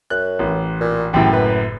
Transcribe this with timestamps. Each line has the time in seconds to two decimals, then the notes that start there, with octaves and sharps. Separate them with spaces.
0.10 F#2 F#6
0.39 A1
0.80 A#2
1.13 F#1 F#2 A2 G4
1.33 B4